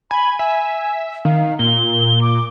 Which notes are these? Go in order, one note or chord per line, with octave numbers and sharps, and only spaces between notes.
G#5 B5
E5 G#5
D#3 F5
A#2 G7
D6